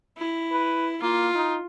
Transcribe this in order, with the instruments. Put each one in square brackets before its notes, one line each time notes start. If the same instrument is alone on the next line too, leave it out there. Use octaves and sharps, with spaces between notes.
[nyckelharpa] E4
[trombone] B4
[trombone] A#3 [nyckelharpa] F4
[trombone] D#4